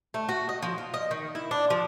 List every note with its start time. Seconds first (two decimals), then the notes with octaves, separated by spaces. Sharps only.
0.14 A3
0.29 F#4
0.49 D#5
0.62 F3
0.78 F4
0.94 D#5
1.11 D#3
1.35 E4
1.51 D4
1.70 F3